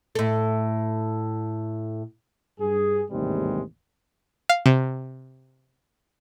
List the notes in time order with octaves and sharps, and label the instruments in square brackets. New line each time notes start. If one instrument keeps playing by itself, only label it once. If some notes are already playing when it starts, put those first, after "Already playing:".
[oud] A2 A4
[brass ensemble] G2 G#4
A1 D#2 G#2 C3 G3 G#3
[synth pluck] F5
C3